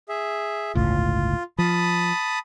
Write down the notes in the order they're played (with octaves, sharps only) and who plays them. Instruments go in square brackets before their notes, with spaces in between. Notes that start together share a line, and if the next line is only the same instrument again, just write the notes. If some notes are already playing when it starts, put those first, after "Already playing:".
[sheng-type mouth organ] G#4 E5
[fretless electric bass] G1 C#2 A2 [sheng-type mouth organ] F4
[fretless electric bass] F3 [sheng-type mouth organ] A5 B5 D#6